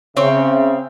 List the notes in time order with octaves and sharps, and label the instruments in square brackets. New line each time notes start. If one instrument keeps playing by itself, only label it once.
[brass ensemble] C#3 E5 [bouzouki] C4 C#5